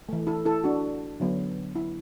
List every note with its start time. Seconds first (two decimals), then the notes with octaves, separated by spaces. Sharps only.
0.09 E3 A3
0.27 E4 A4
0.45 E4 A4
0.64 D4 F#4
1.20 D3 F#3 B3
1.76 E4